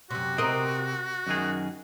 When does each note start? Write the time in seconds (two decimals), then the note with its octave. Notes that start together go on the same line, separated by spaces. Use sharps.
0.10 F#2 C3 F#4
0.38 C3 C4 A#4 D#5
1.27 F#2 D#3 G#4